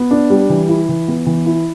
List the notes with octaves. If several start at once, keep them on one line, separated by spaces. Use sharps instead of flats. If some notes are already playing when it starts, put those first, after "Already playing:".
Already playing: B3
D4
G3
E3
E4
E3
B3
E3
E4